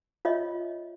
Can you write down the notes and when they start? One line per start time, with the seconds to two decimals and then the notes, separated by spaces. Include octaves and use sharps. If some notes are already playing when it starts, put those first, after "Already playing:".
0.25 F4 C#5 D#5 E5